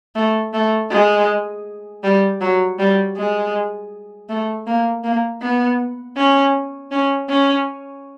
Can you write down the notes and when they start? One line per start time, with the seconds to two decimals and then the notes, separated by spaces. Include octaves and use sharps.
0.16 A3
0.54 A3
0.90 G#3
2.04 G3
2.41 F#3
2.79 G3
3.17 G#3
4.29 A3
4.67 A#3
5.04 A#3
5.42 B3
6.17 C#4
6.91 C#4
7.29 C#4